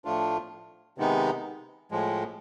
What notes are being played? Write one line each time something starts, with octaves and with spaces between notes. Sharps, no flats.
A2 F3 A3 D4 F4
C3 D#3 G#3 B3 D#4
A2 F3 G#3